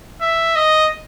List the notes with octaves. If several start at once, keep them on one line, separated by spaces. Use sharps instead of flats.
E5
D#5